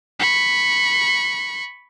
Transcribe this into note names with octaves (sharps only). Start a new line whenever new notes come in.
B5 C#6